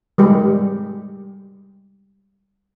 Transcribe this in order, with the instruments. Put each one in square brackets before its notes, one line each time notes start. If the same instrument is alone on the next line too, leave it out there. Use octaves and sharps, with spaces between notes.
[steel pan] G3 G#3 G4